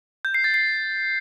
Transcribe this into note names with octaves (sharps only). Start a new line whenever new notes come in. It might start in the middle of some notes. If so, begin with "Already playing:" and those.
G6
C7
A6
C7